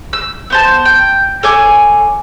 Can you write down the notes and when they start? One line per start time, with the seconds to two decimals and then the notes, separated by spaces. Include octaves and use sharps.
0.13 E6
0.50 B3 C5 A5
0.85 G5
1.43 A4 C#5 G#5 D6